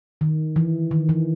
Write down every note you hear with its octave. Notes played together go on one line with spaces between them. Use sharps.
D#3
E3
D#3
E3